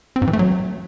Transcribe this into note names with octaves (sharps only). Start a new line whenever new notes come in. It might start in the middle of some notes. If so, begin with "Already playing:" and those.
C4
G#2
E3
A3
F#3